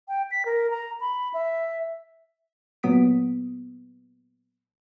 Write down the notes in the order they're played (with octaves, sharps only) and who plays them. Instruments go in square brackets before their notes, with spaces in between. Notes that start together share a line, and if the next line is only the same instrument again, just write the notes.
[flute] G5
B6
A#4
A#5
B5
E5
[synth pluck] A#2 F#3 B3 D#6 B6 D7